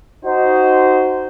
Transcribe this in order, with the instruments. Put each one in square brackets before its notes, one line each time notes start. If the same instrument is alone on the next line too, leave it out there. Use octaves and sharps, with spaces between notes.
[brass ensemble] D#4 F#4 C5